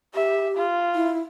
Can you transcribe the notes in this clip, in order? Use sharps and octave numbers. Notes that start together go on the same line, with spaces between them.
G4 E5
F4
E4